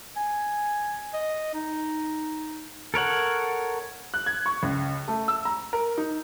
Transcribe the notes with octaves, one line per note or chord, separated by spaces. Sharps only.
G#5
D#5
D#4
A4 A#4 C#5 F#5
F#6
G#6
C#6
C#2
A3
E6
A#5
A#4
D#4